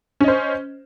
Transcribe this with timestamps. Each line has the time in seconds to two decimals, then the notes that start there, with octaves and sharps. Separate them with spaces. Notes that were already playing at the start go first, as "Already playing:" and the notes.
0.20 C#4
0.24 D#5
0.28 C5